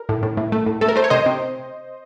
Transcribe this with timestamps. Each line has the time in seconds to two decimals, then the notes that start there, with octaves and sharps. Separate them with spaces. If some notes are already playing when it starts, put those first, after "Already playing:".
Already playing: A#4
0.09 A2
0.23 A2
0.37 A2
0.52 A3
0.66 A2
0.81 A3 A4
0.89 A#4
0.96 A3 C5
1.04 C#5
1.10 C3 C5 D#5
1.26 C3